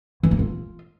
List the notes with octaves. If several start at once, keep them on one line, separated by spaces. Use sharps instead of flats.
E3
A#3
F4